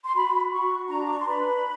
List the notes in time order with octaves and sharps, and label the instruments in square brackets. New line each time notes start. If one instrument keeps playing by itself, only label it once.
[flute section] C6
F#4 B5
F#4 C#6
D4 A#5
D6
C#6
C6
B4 B5